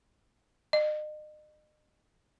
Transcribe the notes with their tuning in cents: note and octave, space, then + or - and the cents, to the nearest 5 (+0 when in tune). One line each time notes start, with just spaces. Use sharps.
D#5 -40